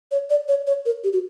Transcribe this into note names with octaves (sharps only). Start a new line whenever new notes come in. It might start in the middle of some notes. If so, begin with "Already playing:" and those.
C#5
D5
C#5
C#5
A#4
G4
F#4